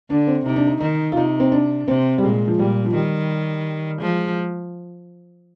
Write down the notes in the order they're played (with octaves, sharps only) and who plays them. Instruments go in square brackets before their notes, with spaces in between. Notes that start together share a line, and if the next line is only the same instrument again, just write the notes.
[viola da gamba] D3 [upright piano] D4
[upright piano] C4
[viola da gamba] C3 [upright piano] D#4
[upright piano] D4
D#4
[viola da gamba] D#3 [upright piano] D#4
[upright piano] F4
[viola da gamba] C3 [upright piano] D#4
[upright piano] C4
D4
[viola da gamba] C3 [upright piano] C4
[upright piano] G3
[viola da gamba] A#2 [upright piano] G#3
[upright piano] F3
[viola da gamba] A#2 [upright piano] G3
[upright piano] F3
[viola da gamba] D#3 [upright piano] G3
[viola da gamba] F3 [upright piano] G#3